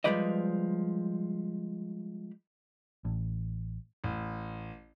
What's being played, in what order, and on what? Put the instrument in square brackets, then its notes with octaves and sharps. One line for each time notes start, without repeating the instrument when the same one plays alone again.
[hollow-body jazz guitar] F3 G3 G#3 B4 D5 D#5
[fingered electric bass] A1
[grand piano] A1